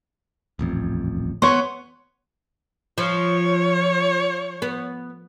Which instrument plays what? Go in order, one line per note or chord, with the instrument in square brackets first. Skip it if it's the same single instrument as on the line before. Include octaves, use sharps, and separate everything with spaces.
[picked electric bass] D#1 A1 F2
[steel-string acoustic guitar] B3 [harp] C#5 C6
[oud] F3 [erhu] C#5
[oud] B3